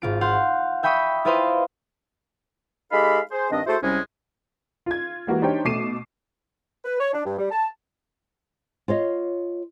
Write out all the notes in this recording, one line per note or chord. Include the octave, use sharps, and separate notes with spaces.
G#1 F4 D7
F5 F#5 C6 F#6 G6
E5 G5 B5 C#6 D#6
E4 F4 B4 C5 D#5 F5
G#3 D#4 G4 A4 F5 B5
G#4 C5
G2 D#3 C4 D4 D#5
A3 E4 F#4 G#4 A4 C5
C2 G3 G#3 C#4
F4 G#6
E3 G#3 A#3 F#4 G4 B4
D4 D#4 G4 C5 C#5 G5
B2 A3 D6 C7 D#7 E7
B4
C#5
D4
G2
G3
A5
F4 C#5 D#5